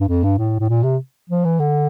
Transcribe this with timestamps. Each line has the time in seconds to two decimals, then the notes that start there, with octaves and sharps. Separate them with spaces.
0.01 G2
0.08 F2
0.23 G2
0.38 A2
0.60 A2
0.69 A#2
0.83 C3
1.30 F3
1.45 E3
1.60 D3